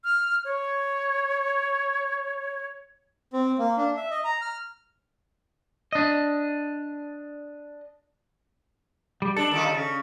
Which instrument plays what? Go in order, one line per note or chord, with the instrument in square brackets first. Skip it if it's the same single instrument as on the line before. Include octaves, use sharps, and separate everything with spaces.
[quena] F6
C#5
[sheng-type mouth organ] C4
A#3
D4
E5
D#5
A#5
F6
[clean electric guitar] D4 D#5
[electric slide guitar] G3
[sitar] D4 [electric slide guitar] A4
[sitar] D#3 G3 F4
C#3